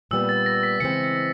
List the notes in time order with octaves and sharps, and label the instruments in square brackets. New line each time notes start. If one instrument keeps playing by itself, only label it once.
[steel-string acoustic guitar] A#2 G3 B3 [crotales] E6
[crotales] A6
A#6
B6
[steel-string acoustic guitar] C#3 E3 G#3 C4 [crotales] C#7
[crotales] C#7